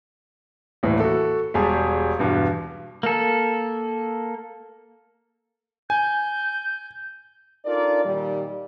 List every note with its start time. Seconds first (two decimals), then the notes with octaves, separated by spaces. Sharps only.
0.83 D#1 A2 E3
1.00 F#4 A4
1.54 E1 G3 G#4 A5
2.19 E2 G2 B2
3.03 A#3 A4
5.90 G#5 G6
7.65 D4 D#4 F4 A4 A#4 D5
8.05 A#2 D#3 G3